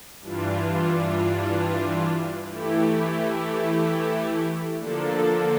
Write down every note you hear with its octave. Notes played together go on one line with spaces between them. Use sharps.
G2 E3 G3 D4 F4
E3 A3 E4 G4
D3 F3 A#3 D4 A4